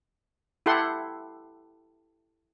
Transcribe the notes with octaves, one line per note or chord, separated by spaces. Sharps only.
E4 G4 A4 F#5 C6